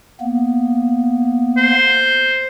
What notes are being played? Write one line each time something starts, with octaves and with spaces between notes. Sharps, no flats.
A#3 B3
C5